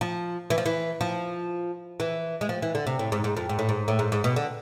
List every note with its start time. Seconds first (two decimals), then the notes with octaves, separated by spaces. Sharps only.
0.01 F3
0.50 E3
0.58 F3
0.66 E3
1.01 F3
2.00 E3
2.41 G#3
2.49 F3
2.62 E3
2.75 D3
2.87 C3
2.99 A2
3.12 G#2
3.24 G#2
3.37 F2
3.49 G#2
3.59 A2
3.69 G#2
3.88 A2
3.99 G#2
4.12 G#2
4.24 B2
4.36 D3